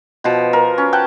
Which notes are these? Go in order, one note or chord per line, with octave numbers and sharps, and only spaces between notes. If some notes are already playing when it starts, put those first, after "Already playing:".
B2 F3
A#4
C#4
F#5 G5 A5